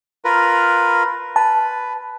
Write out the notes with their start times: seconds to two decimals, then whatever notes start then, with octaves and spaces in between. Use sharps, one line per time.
0.25 F4 A#4 B4
1.36 B4 A5